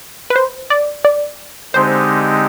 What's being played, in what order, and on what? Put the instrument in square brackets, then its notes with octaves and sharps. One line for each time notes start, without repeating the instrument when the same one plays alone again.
[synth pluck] B4
C5
D5
D5
[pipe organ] D3 G#3 C4 D#4 G4 [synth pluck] C5